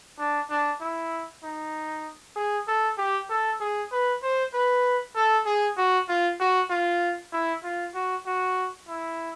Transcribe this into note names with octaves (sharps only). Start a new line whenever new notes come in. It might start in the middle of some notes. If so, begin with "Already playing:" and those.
D4
D4
E4
D#4
G#4
A4
G4
A4
G#4
B4
C5
B4
A4
G#4
F#4
F4
F#4
F4
E4
F4
F#4
F#4
E4